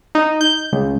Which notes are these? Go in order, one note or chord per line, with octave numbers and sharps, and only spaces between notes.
D#4
G6
C#2